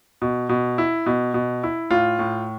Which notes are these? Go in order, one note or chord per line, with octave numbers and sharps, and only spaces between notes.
B2
B2
E4
B2
B2
E4
A2 F4
A2